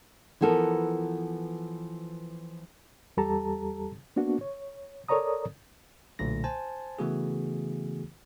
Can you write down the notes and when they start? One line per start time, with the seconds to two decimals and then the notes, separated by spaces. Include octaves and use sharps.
0.41 E3 F3 B3 A4 A#4
3.17 E2 G3 G4 A4 A5 A#5
4.16 A#3 B3 D4 F#4
4.41 C#5
5.08 A4 A#4 C#5 D5 A#5 D#6
6.19 B1 A#2 D3 A3 A#6
6.44 C5 G#5 A5
6.99 C#3 E3 A3 B3 F#4 G#4